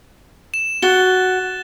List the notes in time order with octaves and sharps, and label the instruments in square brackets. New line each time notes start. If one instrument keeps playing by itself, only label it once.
[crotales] E7
[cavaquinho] F#4 [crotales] F#6 A6 G7